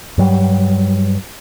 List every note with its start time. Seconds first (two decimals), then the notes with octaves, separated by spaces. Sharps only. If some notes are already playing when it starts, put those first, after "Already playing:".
0.18 G2 F#3 G3